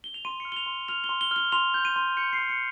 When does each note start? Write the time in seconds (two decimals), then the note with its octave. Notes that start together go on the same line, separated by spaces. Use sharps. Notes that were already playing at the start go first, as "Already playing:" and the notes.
0.04 G7
0.14 F7
0.25 C6 D#7
0.40 F6 C#7
0.52 G7
0.57 F7
0.66 C6
0.88 F6 F7
1.04 G7
1.09 C6
1.21 G7
1.31 F6 G7
1.52 C6 F7
1.74 G6
1.85 D#7
1.96 C6
2.17 G6 C#7
2.33 C7
2.39 C6
2.49 C#7